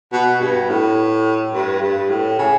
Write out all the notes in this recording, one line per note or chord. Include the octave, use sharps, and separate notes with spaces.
B2
G2
A2
G2
G2
A2
C#3